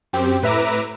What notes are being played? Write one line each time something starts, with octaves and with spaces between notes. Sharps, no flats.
F#2 C4 G4
A2 B4 E5 A#5 D6